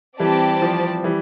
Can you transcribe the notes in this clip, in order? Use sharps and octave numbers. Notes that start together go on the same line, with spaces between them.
E3 G3 C4 G4 D5 A5
F3
E3 G3